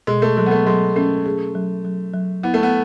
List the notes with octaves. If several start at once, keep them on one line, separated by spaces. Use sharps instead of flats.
B2 G#3
A3
F#3 G#3
B3
A3
F#3 G#3
A3 C#4
G#4
F#3
F#3
F#3
B3 E4
A3
B3